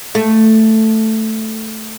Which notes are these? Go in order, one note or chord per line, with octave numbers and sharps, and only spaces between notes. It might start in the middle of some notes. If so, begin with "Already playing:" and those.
A3